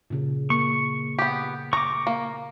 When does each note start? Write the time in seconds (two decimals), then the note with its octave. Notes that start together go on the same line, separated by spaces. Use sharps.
0.10 A#2 C#3
0.50 A#3 C#6
1.19 B3 G4
1.73 A#5 C#6 D6
2.07 A#3